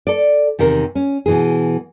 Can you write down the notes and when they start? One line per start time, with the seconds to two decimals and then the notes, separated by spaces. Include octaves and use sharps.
0.07 A4 D5
0.59 E2 C3 D#3 A#4
0.95 C#4
1.26 B2 E3 G#4